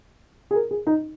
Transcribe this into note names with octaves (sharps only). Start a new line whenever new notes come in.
G#4
A#4
G#4
D#4